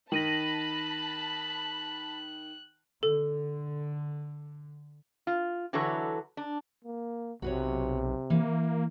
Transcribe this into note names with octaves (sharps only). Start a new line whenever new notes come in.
D#3 A5 B5 F#6 A#6 D#7 F#7
D3 A4
F4
D3 E3 F#3 A4 B4 C#5
D4
A#3
B1 C3 F#4 B4 C#5
E3 A#3